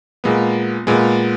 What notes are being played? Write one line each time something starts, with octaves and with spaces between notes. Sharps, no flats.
A#2 G#3 B3
A#2 G#3 B3